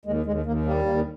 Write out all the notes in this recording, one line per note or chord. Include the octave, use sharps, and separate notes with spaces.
D#2 G#3
D#2 G#3
D#2 A#3
G3 A#3
D#2 A#3